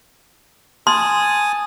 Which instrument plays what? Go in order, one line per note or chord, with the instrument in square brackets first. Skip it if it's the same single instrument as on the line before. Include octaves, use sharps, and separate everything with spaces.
[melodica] G#5 A5 D#6 [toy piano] C6